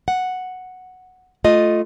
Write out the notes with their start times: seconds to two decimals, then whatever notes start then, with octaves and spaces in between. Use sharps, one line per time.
0.08 F#5
1.44 A3 F4 D#5